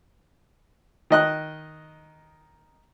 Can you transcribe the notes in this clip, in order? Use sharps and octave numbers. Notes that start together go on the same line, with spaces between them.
D#3 D#5 F#6